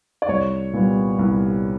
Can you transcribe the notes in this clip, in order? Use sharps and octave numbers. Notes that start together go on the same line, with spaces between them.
D5
C2 C#5
A#2 G3 B3
C2